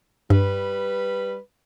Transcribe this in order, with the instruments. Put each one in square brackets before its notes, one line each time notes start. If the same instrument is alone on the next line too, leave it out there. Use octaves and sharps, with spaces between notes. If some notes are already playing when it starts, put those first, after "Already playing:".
[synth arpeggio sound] G2 [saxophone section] G3 B4